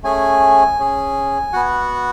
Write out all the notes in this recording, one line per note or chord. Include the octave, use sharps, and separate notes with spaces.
A3 C#4 G#4 G#5
C#4 G#4
B3 F#4 F#5